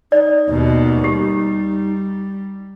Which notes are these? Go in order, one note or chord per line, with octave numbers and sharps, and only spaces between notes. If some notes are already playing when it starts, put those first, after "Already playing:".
D#4 D5
D#2 B2
G3 G4